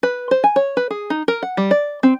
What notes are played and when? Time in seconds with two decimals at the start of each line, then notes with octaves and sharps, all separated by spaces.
0.03 B4
0.31 C5
0.44 G#5
0.56 C#5
0.77 B4
0.91 G#4
1.10 D#4
1.28 A#4
1.43 F#5
1.57 G3
1.71 D5
2.03 C4